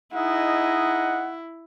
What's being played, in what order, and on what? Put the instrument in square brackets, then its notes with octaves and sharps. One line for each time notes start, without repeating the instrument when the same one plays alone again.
[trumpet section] D#4 G#4 D#5 [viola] E4 [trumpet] F#5